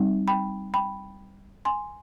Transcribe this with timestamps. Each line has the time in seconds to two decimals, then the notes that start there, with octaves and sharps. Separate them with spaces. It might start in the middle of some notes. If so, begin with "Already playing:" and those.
Already playing: G3 C4 D#4
0.28 G5 B5
0.74 G5 B5
1.65 G#5 C6